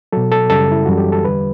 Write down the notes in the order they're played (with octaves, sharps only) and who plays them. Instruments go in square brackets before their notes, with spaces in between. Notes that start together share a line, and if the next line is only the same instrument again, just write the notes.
[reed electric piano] B2 F#3 A4
A4
F#2 C#3 G3 A4
E4
F#2 E3 G3 F#4
G4
A4
E2 D3 G3 B4